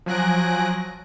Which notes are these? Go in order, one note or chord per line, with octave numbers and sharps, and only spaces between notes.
F3 F#3 G#5 F#6 A#6 D7